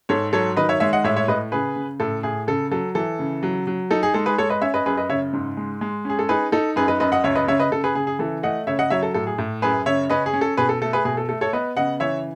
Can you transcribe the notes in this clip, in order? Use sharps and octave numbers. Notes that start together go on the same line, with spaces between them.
G#2 A4 C#5
F#3 A4 C#5
D#3 B4 D#5
C#5 E5
G#3 C#5 E5
D#5 F#5
A2 C#5 E5
C#5 E5
A2 B4 D#5
C#3 G#4 B4
C#3
A2 A4
A2 G#4
C#3 A4
F#3 A4
E3 A4
C#3
F#3
F#3
D#4 A4
G#4
G#3 A4
G#4 B4
G#3 A4 C#5
B4 D#5
C#4 C#5 E5
B4 D#5
F#2 G#4 B4
B4 D#5
C#3 C#5 E5
G#2
G#3
G#3
C#4 G#4
A4
D#4 G#4 B4
D#4 A4
F#2 G#4 B4
B4 D#5
F#2 B4 D#5
D#5 F#5
C#2 C#5 E5
B4 D#5
C#3 C#5 E5
B4 D#5
C#3 A4
G#4 B4
C#3 G#4
G#4
E3 A4
A3 D#5 F#5
C#3 C#5 E5
D#5 F#5
F#3 C#5 E5
A4
A2 A4
G#4
A2
F#2 G#4 B4
C#3 C#5 E5
C#4 B4 D#5
G#4
C#4
A4
B2 G#4 B4
A4
A3 A4
G#4 B4
B2 G#4
A4
A3 A4
A4 C#5
B3 B4 D#5
C#3 D#5 F#5
E3 C#5 E5